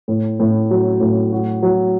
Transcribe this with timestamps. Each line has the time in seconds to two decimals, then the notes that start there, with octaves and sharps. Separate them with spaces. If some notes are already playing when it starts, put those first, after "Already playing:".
0.08 A2
0.40 A2
0.71 F#3
1.00 A2
1.32 F#4
1.62 F#3